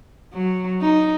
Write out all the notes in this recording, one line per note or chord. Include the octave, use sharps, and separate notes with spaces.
F#3
D#4